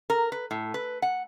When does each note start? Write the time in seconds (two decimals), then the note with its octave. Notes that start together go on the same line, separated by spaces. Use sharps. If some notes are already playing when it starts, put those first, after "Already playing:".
0.10 A#4
0.32 B4
0.51 A2
0.74 B4
1.02 F#5